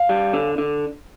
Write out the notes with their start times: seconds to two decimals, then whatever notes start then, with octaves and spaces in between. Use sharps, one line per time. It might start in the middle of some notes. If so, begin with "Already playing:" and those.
Already playing: F5
0.09 G3
0.33 D3
0.58 D3